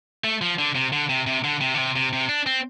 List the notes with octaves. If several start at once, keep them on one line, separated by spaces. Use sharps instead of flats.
A3
F3
D3
C3
D3
C3
C3
D3
C3
D3
C3
C3
C3
D4
C4